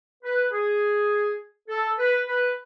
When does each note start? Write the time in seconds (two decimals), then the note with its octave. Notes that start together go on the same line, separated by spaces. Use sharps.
0.23 B4
0.52 G#4
1.68 A4
1.98 B4
2.27 B4